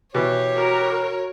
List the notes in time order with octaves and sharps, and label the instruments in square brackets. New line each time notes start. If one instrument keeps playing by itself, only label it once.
[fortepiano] B2 E3 [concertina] G4 [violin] C#5
[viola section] F#4 A#4